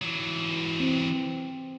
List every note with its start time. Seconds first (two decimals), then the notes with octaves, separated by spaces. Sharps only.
0.02 E3 F#3
0.80 C4